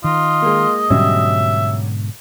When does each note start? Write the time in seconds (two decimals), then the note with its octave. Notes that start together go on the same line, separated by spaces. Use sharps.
0.04 D#3 F4 D#5
0.42 G#3 A#3
0.90 G#2 B2 D3 F#3 G3 C#4 E5